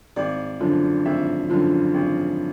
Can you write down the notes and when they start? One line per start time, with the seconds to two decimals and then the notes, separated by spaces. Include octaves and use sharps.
0.16 G#1 D5
0.60 F#2 D3 F3
1.06 G#1 E5
1.50 F#2 D3 F3
1.94 G#1